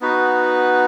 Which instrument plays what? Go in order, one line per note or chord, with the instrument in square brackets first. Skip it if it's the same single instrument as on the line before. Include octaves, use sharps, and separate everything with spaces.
[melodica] B3 D#4 F#4 B4